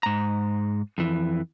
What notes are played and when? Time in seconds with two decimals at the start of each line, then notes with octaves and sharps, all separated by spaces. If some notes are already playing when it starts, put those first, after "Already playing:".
0.03 G#2 A#5
0.98 F2 E3